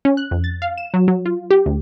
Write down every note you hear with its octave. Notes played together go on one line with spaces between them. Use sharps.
C#4
F#6
F2
A6
F5
E7
F#3
F#3
F4
G4
D2